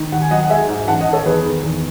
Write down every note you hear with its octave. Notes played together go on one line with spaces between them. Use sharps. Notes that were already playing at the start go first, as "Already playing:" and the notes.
Already playing: D#3
D#2 F#5
G#5
F#3 D#5 F#5
F#5
G#3 E5 G#5
G#2
A1 F#5 A5
D#5 F#5
D#3
A4 C#5
E2 G#4 B4
D#3
E2